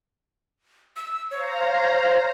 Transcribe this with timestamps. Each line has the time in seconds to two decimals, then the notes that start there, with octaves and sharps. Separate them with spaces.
0.96 E6
1.31 C5 C#5 F5 A#5